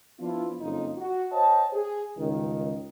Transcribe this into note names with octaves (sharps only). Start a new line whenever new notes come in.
F3 B3 D4 E4 F4
F#1 F2 D#4 F4
F#4
C5 C#5 D#5 G5 A5
G#4
C#2 G2 D#3